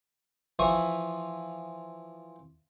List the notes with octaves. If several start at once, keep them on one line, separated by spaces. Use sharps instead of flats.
E3 F3 E5 C#6 D#6